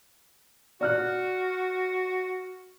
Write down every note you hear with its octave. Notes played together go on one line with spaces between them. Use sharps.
F#4 D5 F6 F#6